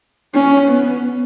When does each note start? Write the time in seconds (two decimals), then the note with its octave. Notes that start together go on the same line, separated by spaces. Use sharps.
0.35 C#4
0.68 B3